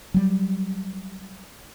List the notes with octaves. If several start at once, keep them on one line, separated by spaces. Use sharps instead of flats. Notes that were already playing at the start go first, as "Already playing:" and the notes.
F#3 G3